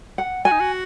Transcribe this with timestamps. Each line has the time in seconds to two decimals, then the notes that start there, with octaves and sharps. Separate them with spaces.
0.18 F#5
0.44 F#4 G#5
0.52 D#4
0.60 F#4